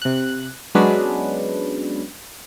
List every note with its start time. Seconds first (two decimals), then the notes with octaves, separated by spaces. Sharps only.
0.02 C3 F#6
0.75 F#3 G#3 B3 C#4 D4 B4